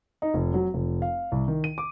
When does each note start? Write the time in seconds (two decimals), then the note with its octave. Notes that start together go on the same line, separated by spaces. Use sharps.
0.22 D#4
0.34 F1
0.54 F#3
0.74 F1
1.02 F5
1.32 C2
1.48 D#3
1.64 D#7
1.78 D6